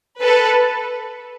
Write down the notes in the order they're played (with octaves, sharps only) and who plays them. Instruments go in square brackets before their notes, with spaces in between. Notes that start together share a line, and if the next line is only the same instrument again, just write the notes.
[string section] A4 B4